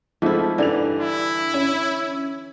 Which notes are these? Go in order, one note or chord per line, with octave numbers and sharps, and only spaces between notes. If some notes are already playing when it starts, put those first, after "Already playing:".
G#2 F3 A3 C4 E4
G2 D3 E3 D5 F7
E4
C#4